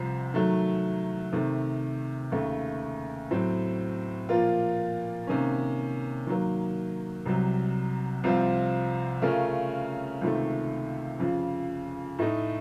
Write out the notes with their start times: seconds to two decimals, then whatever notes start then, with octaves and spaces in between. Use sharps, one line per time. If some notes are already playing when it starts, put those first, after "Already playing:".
Already playing: C2 C3 F3 C4
0.34 D#3 F#3 A3
1.33 C3 D#3 A3
2.32 D#2 C#3 A3
3.31 A2 F#3 C4
4.29 A#2 F3 A#3 F4
5.27 C3 D#3 A#3 C#4
6.27 D#3 F#3 A#3
7.26 C2 C3 F#3
8.24 C2 C3 F3 C4 F4
9.22 C#3 A3 C#4 F4 A#4
10.22 C#2 C3 D#3 A3
11.19 F2 C#3 F3
12.19 A2 A3 D#4